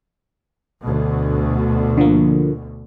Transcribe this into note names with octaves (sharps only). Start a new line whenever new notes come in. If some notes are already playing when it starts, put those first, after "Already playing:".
D2 B2
D3 F3 A#3